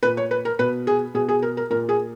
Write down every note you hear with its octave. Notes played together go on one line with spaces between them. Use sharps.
A#2 B4
C#5
B4
A#4
B2 B4
G#4
B2 G#4
G#4
A#4
A#4
A#2 A#4
G#4